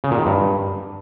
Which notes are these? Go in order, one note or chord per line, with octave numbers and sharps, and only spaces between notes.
C#3
A#2
D#3
G2